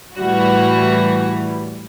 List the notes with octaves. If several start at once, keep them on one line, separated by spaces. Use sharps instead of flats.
A2 E3 G3 F#4